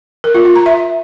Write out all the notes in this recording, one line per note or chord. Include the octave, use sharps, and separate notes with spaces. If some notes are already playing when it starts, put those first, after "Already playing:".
A#4
F4
F4
A#5
E5